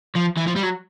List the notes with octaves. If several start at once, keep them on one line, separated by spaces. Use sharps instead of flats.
F3
E3
F3
G3
F#3